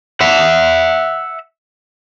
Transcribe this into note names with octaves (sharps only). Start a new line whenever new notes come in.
E5 F#5